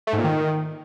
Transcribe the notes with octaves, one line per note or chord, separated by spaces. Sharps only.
A3
G#2
A#2
D#3